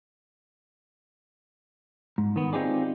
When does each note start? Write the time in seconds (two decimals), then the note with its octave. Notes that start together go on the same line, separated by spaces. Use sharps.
2.18 G#2
2.36 D#3 B3
2.53 C4 D#4 F4 G4 G#4 D5